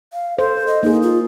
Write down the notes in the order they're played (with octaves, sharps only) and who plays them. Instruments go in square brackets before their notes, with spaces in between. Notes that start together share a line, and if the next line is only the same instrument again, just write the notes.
[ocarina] F5
[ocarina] A4 [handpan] C5
[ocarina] D#5
[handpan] A#3 G#4 [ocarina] D#4
[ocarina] F4